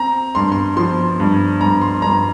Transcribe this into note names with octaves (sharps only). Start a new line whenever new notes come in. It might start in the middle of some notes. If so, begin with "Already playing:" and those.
Already playing: C4 A#5
G2 C6
C6
F3 C6
G2
G2 A#5
C6
G2 A#5